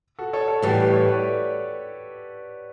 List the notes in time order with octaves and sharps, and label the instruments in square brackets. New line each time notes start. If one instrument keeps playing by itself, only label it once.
[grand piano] F#4 A4
A4 C#5
A4 C#5
[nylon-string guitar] A2 E3 G3 [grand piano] F#4 A4
[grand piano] G4 B4
A4 C#5
B4 D5